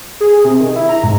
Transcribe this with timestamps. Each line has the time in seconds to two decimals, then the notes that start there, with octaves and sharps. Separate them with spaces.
0.20 G#4
0.45 C3
0.60 D#3
0.76 E4
0.89 A#5
1.04 G#2